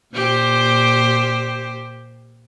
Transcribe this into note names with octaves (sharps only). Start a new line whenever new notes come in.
A#2 G4 C5